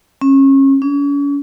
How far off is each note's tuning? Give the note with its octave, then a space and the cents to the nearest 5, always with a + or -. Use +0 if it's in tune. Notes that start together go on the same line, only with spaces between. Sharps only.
C#4 -30
C#4 +40